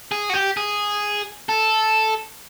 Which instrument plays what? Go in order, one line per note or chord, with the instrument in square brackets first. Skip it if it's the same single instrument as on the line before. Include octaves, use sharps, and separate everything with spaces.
[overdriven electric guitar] G#4
F#4
G4
G#4
A4